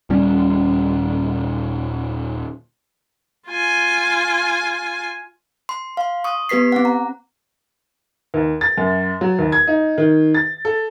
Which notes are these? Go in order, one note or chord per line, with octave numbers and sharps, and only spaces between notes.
D#1 A#2 G3 C#4
F4 G#5
C6
F5 C6
C#6 D#6
B3 G4 B4 B6 C7
C4 F#5
A#5
D#2
A6
F#2
F#3
D#2
G#6
D#4
D#3
A6
A4